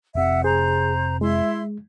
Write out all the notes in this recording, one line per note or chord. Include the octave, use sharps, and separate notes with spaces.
F1 C3 E5 F#5
G#4 C5 A#5
G#3 E4 E5 C6